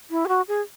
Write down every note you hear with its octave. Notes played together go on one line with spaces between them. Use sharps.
E4
G#4
F#4
G#4